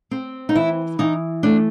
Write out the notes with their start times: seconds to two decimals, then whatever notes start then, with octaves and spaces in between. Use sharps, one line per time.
0.11 C4
0.49 D#4
0.55 E3 E4
0.99 E3 D#4
1.43 A3 D4